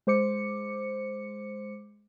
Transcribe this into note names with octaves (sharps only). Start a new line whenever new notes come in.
G#3 C5 D6 C#7